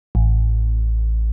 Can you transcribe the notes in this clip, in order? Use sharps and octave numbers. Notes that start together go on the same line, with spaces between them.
A1